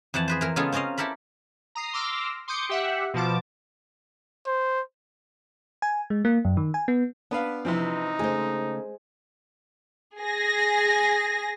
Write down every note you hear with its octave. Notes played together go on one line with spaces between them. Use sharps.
F2 E3 F#5 A5
G#4 B4 C5
E3 A#4
C#3 G#3 B3 F4 G#4 A4
C4 C#4 A#4 D#5 F5
E4 G4 A4 A#4 B5
A#5 D#6 C7
C6 D6 E6 F6 A#6
C6 D6 D#6 G6 C#7
G4 E5 F#5
B2 F3 A5 D6
C5
G#5
G#3
A#3
F#2
D#3
G#5
B3
B3 D4 B4 F5
C3 E3 F3 C4 D#4 F4 B4
C#3 G#3 A3 C5
G#4 A#6